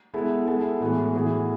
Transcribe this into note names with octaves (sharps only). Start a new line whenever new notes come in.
G#3 B3 E4 A4
G#3 B3 E4 A4
A2 E3 G#3 B3 F#4
A2 E3 B3 E4 G#4